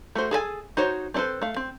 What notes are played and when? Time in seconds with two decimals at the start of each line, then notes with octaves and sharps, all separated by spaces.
0.15 A3 F#4 C5
0.31 G#4 A4 B4 G#5
0.77 D#4 F#4 C5 C#5
1.14 C4 D4 A4 B4 C5
1.42 A3 F5
1.56 C4